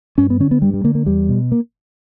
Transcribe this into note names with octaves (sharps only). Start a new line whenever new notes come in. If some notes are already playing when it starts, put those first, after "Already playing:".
G2 C#4
B3
D3 C#4
B3
G2 G3
G3
D3 A#3
A#3
E2 G3
B2
A#3